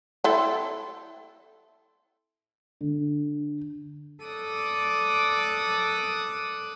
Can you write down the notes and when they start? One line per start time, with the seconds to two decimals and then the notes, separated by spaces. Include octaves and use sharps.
0.24 C4 E4 A4
2.81 D3
4.24 A4 D5 D6 D#6 F#6